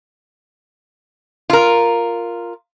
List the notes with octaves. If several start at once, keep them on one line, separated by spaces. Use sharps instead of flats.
F4 A#4